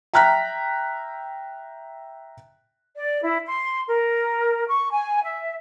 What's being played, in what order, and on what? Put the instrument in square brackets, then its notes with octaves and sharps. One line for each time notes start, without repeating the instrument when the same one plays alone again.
[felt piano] E5 G5 A#5 F6 F#6 B6
[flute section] D5
E4
C6
A#4
C#6
G#5
E5